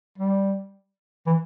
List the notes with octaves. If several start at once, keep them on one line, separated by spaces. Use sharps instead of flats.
G3
E3